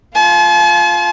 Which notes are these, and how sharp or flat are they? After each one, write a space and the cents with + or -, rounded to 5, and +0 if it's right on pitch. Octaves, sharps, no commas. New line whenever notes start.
F4 +0 A5 -45